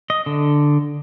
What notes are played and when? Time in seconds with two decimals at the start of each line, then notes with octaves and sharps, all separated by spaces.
0.10 D#5
0.26 D3